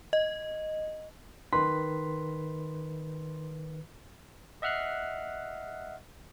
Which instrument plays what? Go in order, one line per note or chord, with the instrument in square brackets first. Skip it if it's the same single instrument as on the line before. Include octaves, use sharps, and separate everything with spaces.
[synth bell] D#5
[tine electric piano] D#3 B4 B6 [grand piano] C6
[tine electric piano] D#5 E5 F#5 F6 F#6 C7